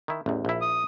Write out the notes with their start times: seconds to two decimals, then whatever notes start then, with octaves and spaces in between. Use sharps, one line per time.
0.08 D#3 E4
0.26 A1 E2
0.45 A#1 E4
0.61 D#6